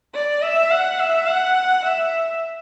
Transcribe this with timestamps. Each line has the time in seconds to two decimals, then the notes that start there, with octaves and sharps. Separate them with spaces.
0.14 D5
0.42 E5
0.71 F#5
0.99 E5
1.27 F#5
1.84 E5